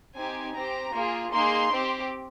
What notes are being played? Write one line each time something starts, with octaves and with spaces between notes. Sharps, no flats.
C4 D#4 G4 G#5
C4 G4 A#5
A#3 F4 G#4
A#3 D#4 G#4 C6
C4 G4